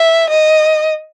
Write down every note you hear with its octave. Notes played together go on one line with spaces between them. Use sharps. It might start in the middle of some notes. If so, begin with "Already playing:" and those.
Already playing: E5
D#5